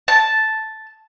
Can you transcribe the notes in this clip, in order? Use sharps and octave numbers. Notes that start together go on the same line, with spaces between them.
A5